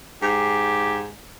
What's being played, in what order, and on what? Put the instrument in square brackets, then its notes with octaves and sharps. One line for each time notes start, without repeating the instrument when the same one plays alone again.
[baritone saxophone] G#2 [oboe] G4